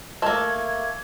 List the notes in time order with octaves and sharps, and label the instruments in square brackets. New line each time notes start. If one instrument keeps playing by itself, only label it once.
[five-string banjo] A3 A#3 [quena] G#6